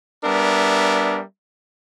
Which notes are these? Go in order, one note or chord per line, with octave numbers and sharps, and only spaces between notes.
G3 B3 D4 A#4 E5